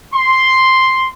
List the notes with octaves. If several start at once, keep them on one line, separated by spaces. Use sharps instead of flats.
C6